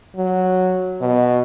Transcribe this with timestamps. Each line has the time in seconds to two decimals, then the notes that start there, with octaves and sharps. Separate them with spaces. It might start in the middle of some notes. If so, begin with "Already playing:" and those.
0.16 F#3
1.01 B2